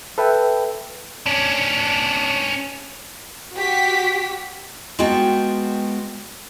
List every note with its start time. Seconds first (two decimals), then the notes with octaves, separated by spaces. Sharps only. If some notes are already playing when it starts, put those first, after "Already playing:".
0.18 A4 B4 E5 G5
1.26 C#4 D4
3.54 F#4 G4 B6
4.99 G#3 B3 F4 F#4 G5 A5